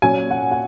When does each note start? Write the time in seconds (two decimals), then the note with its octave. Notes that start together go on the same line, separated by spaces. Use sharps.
0.02 A#2 F#3 C#4 G#5
0.31 F#5
0.51 F#5